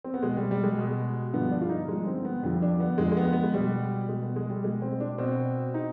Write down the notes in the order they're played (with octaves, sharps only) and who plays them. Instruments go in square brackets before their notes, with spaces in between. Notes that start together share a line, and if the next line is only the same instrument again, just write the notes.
[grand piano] C4
B3
B2 G#3
G3
G3
G#3
B2
G2 D3 F3 B3
D4
F4
D#4
G2 D3 F3 G#3
C4
B3
F2 D3 F3 G3
D4
B3
F2 D3 F3 G#3
G#3
B3
B3
G#3
B2 G3
B2 G#3
B3
G#3
G3
B2 G#3
C4
D4
B2 C4
D#4